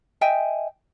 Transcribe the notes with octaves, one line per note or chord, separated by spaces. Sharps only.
D#5 E5 G5 G#5